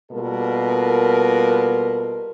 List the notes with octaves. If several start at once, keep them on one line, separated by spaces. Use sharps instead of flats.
B2 G3 A#3 F4 A4 A#4